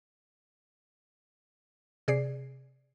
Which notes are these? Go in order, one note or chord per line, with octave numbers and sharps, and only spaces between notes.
C3 G#4 D5 C7